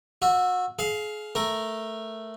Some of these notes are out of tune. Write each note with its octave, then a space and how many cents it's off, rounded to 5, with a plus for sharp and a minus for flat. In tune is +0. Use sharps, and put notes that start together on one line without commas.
F#4 -30 E5 +0
G#4 +35 F5 +0
A3 +0 A#4 +0